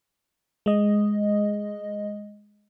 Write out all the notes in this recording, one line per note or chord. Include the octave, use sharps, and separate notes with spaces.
G#3 D#5